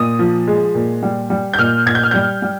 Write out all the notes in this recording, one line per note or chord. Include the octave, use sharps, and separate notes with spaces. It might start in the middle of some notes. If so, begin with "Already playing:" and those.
Already playing: A#2 D#6
F3
G#3
A#2
G3
G3
G6
A#2 F6
A#2 G#6
G6
F6
G3 G6
G3